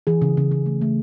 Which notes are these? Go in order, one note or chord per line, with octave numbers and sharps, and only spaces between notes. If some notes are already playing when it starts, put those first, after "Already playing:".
E3 G#4
C#3
C#3
C#3
A3
A3